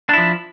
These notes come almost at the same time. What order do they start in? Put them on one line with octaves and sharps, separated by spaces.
D4 E4 F3